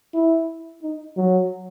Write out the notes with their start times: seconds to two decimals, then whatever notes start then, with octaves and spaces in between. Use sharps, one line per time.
0.14 E4
0.83 D#4
1.17 F#3